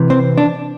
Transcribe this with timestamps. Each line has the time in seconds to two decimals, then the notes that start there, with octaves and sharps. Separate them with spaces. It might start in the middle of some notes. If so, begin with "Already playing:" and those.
Already playing: C3 E3
0.10 C4
0.38 D4